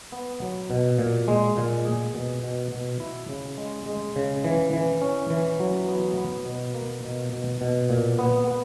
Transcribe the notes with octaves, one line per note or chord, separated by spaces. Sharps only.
B3
F#3
B2
A#2
G#3
A#2
G#4
B2
B2
B2
E4
C#3
G#3
G#3
C#3
E3
E3
C#4
E3
F#3
B3
B3
B2
A#3
B2
B2
B2
A#2
B3
B3